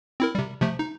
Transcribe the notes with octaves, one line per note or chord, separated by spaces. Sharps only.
C4 E4 A#4
C3 G3
C3 F3 A3
D#4